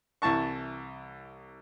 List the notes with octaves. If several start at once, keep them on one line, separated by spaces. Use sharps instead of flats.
C2 E3 A5 C#6